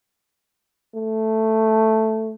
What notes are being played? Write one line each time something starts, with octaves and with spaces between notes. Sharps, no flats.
A3